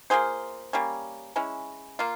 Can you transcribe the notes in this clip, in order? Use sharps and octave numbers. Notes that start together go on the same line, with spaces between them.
A#3 F4 G#4 C5
G3 A#3 C#4
G#3 C#4 E4
A#3 F4